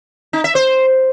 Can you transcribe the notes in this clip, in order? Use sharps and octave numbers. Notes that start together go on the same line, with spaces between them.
D#4
E5
C5